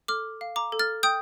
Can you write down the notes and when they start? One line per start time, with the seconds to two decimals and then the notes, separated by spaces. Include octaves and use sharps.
0.08 A4 D6 F6
0.41 F5
0.56 A#5 D6
0.72 A4
0.79 F6 A6
1.03 G5 D#6 G6